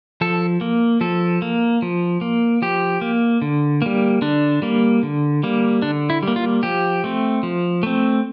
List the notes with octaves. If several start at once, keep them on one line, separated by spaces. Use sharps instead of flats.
F3 A4
A#3
F3 A4
A#3
F3
A#3
F3 G4
A#3
D3
G3 A#3
D3 D4
G3 A#3
D3
G3 A#3
D3 D4
E4
G3 A#3
F4
F3 G4
A3 C4
F3
A3 C4